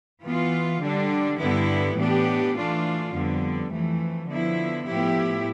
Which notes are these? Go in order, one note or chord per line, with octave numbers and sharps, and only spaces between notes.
E3 B3 F4
D3 G3 D4
G2 D3 G3 B3 E4
A2 E3 B3 D4 G4
E3 A3 D4 F4
F2 D3 G3 B3
F2 E3 A3
D3 F3 B3 E4
A2 F3 B3 E4 G4